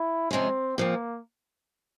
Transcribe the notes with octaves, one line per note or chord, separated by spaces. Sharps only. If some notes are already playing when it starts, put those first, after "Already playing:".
Already playing: E4
C3 F3 G#3 C4 C#4
A#2 F3 A#3 C4